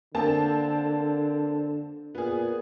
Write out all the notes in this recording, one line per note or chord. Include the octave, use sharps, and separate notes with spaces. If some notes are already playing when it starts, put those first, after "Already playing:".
D3 A#3 C4 A5
A#2 B3 G#4